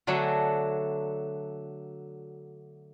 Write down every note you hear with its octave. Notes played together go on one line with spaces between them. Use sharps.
D3 F#3 A3 D4 F#4 G#5